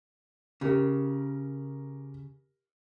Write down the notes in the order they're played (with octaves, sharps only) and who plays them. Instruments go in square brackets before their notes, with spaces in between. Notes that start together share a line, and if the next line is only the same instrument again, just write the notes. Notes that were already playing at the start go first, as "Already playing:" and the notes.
[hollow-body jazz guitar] C#3 [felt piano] G4 A#4